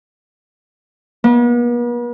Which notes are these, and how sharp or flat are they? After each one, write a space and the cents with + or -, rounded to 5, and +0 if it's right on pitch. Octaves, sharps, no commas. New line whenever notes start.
B3 -45